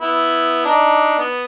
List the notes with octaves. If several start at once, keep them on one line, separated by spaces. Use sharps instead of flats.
B3 E4
D4 D#4
B3